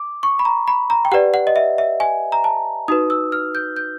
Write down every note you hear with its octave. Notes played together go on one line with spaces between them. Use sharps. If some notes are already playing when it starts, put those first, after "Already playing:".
Already playing: D6
C#6
B5
A#5
B5
A#5
G5
G4 B4 D5 F#5
F#5
D#5
E5
E5
G#5
A#5
A5
D#4 F#4 B4 D#6
E6
F6
G6
G6